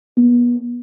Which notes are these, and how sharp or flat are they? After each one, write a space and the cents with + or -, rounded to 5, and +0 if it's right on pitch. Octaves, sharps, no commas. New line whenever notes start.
B3 -35